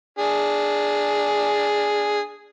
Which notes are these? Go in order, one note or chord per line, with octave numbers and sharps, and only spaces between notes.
D4 G#4